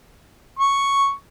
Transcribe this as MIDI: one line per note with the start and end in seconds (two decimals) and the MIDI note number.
0.59 1.13 85